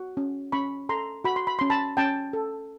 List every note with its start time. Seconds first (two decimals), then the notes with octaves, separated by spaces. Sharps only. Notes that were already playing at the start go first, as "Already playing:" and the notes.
Already playing: F#4
0.17 C#4
0.52 C#4 B5 C#6
0.89 A4 A#5 C6
1.24 F#4 B5
1.36 C6
1.47 B5
1.59 C#4 C6
1.70 A5 B5
1.97 C#4 G5 A5
2.33 A4